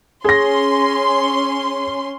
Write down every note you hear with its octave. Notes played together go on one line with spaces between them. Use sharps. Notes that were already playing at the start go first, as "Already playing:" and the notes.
C#4 G#4 C6 A#6